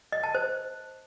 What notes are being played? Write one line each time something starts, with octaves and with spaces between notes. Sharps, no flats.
D#5
A5
C5